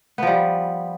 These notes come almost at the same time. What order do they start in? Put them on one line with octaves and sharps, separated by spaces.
B3 F3 G3